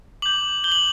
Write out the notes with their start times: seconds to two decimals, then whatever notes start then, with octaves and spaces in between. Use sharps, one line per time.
0.22 D6 G6 F#7
0.64 G6 G7
0.68 D6 F#7